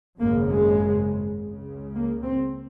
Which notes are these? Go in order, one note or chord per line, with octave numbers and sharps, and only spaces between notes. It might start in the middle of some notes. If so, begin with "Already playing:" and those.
G#1 F#2 C#3 A#3
G#3
C#2 C#3
A#3
C4